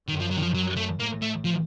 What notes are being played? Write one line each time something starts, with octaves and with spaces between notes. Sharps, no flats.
F#2 D#3
F3
F#3
D#3
F3
F#3
A3
A2 A#3
A3
F3